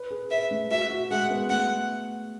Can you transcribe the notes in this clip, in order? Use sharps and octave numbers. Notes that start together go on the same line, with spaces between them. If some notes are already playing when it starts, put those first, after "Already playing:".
Already playing: B4
G#4
B4 E5
A3
F#4 E5
F#4
G#3 F#5
B3
A3 F#5